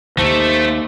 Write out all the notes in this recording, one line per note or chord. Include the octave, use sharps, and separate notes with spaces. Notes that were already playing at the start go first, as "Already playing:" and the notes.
D#2 A3 C5